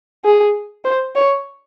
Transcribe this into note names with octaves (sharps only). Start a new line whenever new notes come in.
G#4
C5
C#5